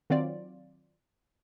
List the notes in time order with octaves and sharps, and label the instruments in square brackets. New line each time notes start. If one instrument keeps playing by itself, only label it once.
[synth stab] D#3 F#3 C4 F4 D5